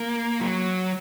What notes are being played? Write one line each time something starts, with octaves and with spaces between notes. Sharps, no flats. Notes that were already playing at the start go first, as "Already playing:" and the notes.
Already playing: A#3
F#3